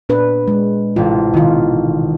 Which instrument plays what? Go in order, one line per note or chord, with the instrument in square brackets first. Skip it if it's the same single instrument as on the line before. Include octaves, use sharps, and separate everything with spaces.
[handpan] A#2 D4 B4
G#3
[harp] A1 C3 [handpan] F4
[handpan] B2 F4 [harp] D#3